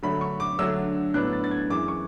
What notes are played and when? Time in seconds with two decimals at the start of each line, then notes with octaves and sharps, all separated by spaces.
0.03 D3 F#3 A3 B5
0.21 C#6
0.40 D6
0.59 D3 F#3 A3 D4 E6
1.14 A2 F#3 B3 D4 F#6
1.33 A6
1.44 A6
1.51 G#6
1.70 F#2 E3 G#3 D6
1.88 C#6